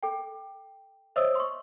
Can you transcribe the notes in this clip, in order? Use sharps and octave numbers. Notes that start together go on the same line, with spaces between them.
A4 G5
C5 C#5 D#5 E5 D#6 E6
C6 C#6